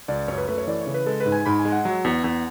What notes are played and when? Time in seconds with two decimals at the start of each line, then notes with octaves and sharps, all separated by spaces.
0.08 C#2 D5
0.28 F#2 C#5
0.38 B4
0.48 A3 B4
0.58 C#5
0.67 E3 D5
0.81 C#5
0.87 C#3
0.94 B4
1.06 G#3 A4
1.20 B4
1.26 G#2
1.32 G#5
1.46 G#2 B5
1.59 G#5
1.65 G#3
1.72 F#5
1.85 F#3
2.05 E2
2.24 E2